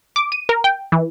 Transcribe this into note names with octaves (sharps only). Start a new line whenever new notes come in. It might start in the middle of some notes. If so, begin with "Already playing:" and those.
D6
D#7
A#4
G5
E3